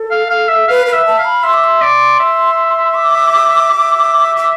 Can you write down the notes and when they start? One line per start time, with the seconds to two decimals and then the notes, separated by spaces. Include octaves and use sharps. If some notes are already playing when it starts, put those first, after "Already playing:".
Already playing: A4
0.11 F5
0.30 F5
0.49 E5
0.68 B4 F5
0.86 B4
0.93 E5
1.06 A5
1.19 F5
1.25 B5
1.43 E5 C6
1.53 D6
1.64 C6
1.82 D5
2.20 E5
2.95 D6
3.71 E5
4.37 D6